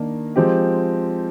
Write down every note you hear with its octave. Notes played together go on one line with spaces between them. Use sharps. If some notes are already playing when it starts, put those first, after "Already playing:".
Already playing: D#3 A#3 D4
F3 G#3 C4 G4